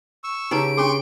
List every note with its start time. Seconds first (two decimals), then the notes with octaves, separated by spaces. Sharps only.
0.24 C#6 E6
0.51 C#3 D#4 G4 B4 A#5 D7
0.77 C#4 D4 G#4 C6 C#6